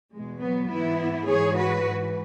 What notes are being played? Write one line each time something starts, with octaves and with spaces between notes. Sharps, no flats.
E2 B2 G#3
F#3 B3
G#2 E3 B3 E4
G#2 E3 G#4 C#5
F#4 B4
G#2 E3